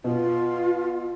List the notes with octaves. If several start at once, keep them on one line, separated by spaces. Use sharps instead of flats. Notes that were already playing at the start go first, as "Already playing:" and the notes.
B2 F4